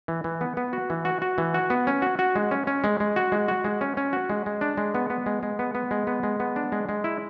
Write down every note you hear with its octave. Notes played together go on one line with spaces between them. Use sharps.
E3
E3
B3
B3
F#4
E3
F#4
F#4
E3
F#4
B3
C#4
F#4
F#4
G#3
C#4
C#4
G#3
G#3
F#4
G#3
F#4
G#3
C#4
C#4
F#4
G#3
G#3
D4
G#3
B3
B3
G#3
G#3
B3
B3
G#3
B3
G#3
B3
D4
G#3
G#3
E4